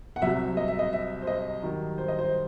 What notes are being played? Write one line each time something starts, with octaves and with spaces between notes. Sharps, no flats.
F#5
C2 C3 F#3 E5
D#5
E5
D#5
E5
C5
D#5
G2 D#3 F#3
C5
D#5
C5